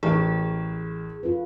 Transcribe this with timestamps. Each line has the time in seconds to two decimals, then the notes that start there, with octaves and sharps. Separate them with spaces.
0.03 A1 G#4 A#4 G5
1.23 F4 A4 B4